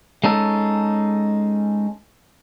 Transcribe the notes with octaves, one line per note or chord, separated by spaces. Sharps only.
G#3 C#4 D#4 A4